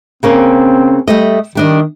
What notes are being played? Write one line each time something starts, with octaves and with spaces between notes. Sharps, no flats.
C#3 A#3 C4 C#4
G3 A3 D#5
D#3 G3 D4 D#5